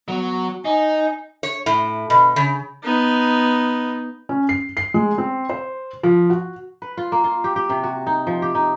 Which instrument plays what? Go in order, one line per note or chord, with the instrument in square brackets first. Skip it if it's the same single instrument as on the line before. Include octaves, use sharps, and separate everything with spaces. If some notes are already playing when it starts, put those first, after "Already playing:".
[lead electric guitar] F#3 [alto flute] B3
[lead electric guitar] D#4 [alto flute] G#5
[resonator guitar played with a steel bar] C#5
A2
B2
C#3
[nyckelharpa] B3 D#4
[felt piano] C#4
C7
C7
G#3
C4
C5
F3
F#4
[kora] B4
F4
A#3
F4
G4
G4
C3
F#4
D#4
F3
G4
D#4